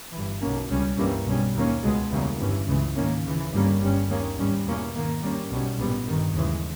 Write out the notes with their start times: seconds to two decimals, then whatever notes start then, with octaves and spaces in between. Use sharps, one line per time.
0.12 G1 G2 E3
0.41 B1 B2 A#3 C#4
0.69 C#2 C#3 G3 C#4
0.97 G2 E3 G3 A#3 C#4
1.25 B1 B2 G3 C#4
1.54 D#2 D#3 A#3 C#4
1.82 C#2 B2 G#3 B3
2.11 E2 C#3 G3 A#3 C#4
2.38 G1 G2 E3 G3 C#4
2.67 C#2 C#3 E3 G#3
2.95 G#2 D#3 A#3 C#4
3.23 C#2 C#3 E3
3.52 G1 G2 G3 A#3 C#4
3.81 G1 G2 G3 C#4
4.08 D#2 D#3 A#3 C#4
4.37 G#1 G#2 G3 C#4
4.65 E2 B2 A#3 C#4
4.93 G#2 D#3 A#3
5.22 G2 G3 A#3 C#4
5.50 B1 B2 G3 C#4
5.78 A#1 G#2 G3 B3
6.06 G1 G2 D#3
6.35 D#2 C#3 E3 G#3